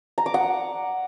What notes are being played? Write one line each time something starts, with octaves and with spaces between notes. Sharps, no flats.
A#5
D6
F#5